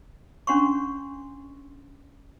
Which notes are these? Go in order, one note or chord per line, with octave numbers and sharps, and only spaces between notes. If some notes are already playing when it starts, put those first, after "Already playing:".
C#4 D4 F#5 C6 C#6